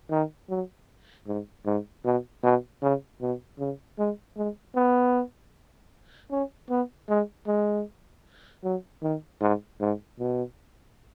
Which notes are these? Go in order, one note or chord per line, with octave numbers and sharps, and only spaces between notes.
D#3
F#3
G#2
G#2
B2
B2
C#3
B2
C#3
G#3
G#3
B3
C#4
B3
G#3
G#3
F#3
D#3
G#2
G#2
B2